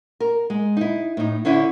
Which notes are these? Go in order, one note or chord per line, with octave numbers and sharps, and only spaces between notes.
A#4
G#3
D#4 E4
A2 D#4
D3 C#4 D4 E4